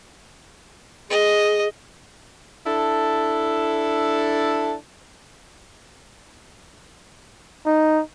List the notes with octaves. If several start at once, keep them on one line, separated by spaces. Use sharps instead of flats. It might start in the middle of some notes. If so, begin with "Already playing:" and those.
G#4 D#5
D4 E4 A4
D#4